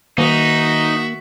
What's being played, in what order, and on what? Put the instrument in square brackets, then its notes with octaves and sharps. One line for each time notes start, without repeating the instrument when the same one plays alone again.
[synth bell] D#3 [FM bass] A#3 [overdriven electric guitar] D#4 [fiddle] F#4 E5